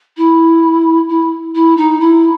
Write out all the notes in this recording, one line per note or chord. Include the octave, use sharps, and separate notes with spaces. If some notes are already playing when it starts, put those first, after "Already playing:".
E4
E4
E4
D#4
E4